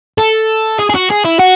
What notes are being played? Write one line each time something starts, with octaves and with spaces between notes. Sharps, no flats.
A4
G#4
G#4
F#4
G#4
E4
F#4